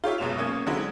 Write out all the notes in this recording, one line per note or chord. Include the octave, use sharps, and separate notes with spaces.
F4 G4 C#5 E5
F#1 B2 F#3 G#3 E7 F7
A#3 C#4 D#6 G#6
D3 F#3 G#3 C4 D#4 E4